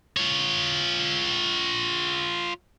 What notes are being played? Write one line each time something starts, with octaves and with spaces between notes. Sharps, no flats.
F4 C#5